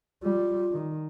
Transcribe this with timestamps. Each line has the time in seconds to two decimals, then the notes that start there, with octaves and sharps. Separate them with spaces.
0.23 G3 F4
0.71 D#3